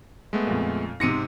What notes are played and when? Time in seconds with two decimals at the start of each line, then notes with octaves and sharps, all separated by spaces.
0.33 G#3 A3 B3
0.47 F2 A#2
1.00 G#2 C3 A#6 C#7 D#7